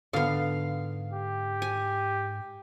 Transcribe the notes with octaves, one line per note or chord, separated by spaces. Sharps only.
G#2 D3 B3 F5
G4
G#5